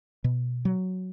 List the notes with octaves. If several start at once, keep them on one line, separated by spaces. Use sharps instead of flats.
B2
F#3